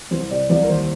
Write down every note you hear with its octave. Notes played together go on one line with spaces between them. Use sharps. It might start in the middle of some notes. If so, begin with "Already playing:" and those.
C2 C5
C3 D5
C2 D5
A#4
D#2 C5